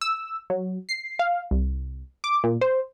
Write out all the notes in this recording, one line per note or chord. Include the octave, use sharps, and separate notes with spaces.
E6
F#3
C7
F5
C2
D6
A#2
C5